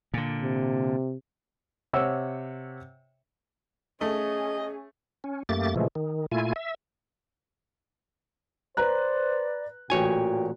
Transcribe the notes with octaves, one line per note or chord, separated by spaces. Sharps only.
A#2 D3
C3
C3 C#5 F#5 E6
A3 C#4 G#4 D#5
C#4
F#2 A3 A#3 G4 A6
A#2 C#3 E3 F3 G#3 A3
D#3
A#2 A3 E4 F4 G#5
E5
B4 C5 D5 A#5 F#6
A1 A#2 F#4 C#5 G5 G#5